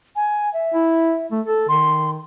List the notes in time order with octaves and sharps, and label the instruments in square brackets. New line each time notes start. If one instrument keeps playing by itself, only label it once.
[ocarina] G#5
E5
[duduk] E4
A3
A4
[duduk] D#3 [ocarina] C6